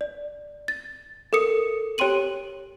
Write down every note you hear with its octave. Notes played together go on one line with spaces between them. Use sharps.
D5
A6
A4 A#4 D#6 C#7
G4 C#5 G5 C6 D#7 F#7